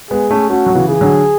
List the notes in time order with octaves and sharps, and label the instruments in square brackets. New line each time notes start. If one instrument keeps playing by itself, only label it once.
[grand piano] G#3 B3 [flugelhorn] G#4
[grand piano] A3 C#4
[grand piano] A3 C#4 [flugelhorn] F#4
[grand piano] F#3
C#3 E3
[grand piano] E3 [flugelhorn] G#4
[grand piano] D3 F#3